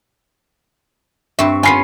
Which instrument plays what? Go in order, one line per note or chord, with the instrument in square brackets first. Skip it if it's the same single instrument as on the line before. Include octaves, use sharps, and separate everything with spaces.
[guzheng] G2 C4 [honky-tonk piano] E5 C#6
[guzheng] B3 C#4 F4 [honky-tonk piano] G#5 B5 C7